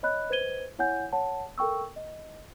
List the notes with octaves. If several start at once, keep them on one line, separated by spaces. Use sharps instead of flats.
C#5 D#5 B5 F#6
B4 C5 D#5 G#6 D#7 G7
E4 C#5 F#5 G#5 G6
C#5 F#5 A5
A4 A#4 G5 C#6 E6
D#5